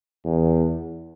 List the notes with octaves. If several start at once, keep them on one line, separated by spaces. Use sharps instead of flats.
E2